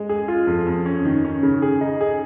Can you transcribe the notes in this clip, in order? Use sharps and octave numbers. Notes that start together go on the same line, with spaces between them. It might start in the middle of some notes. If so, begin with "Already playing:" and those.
Already playing: G#3
G#4
F4
F2
F2
C#4
D#3
C#4
C#3
G#4
D#4
G#4